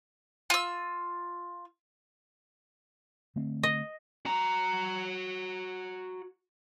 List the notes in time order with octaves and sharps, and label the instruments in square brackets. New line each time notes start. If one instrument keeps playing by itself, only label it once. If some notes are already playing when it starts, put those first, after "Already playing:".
[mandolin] F4 E6
[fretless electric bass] D3 A3 C4
[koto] D#5
[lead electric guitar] F#4 A#5